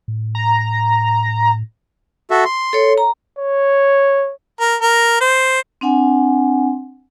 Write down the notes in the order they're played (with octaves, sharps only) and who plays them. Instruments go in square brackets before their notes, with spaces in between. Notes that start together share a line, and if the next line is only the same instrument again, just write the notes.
[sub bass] A2
[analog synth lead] A#5
[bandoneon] F#4 A4 E5
C6
[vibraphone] A4 C#5
A#5
[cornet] C#5
[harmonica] A#4
A#4
C5
[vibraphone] C4 D4 F#5 G#5